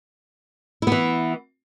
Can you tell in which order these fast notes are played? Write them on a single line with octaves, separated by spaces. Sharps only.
E4 B3 E3